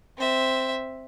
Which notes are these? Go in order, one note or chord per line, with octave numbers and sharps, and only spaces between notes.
C4 E5